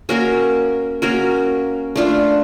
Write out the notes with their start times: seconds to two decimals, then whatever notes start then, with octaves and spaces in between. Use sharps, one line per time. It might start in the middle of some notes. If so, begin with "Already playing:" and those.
0.09 A#3 C#4 F#4 A#4
1.02 A#3 C#4 F#4 A#4
1.96 A3 D4 F4